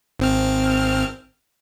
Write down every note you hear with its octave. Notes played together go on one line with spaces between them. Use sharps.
G#1 C4 F6